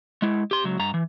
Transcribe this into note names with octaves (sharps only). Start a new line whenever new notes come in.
G#3 E4
G4 C6
C#2 F#3
G2 A#5
E3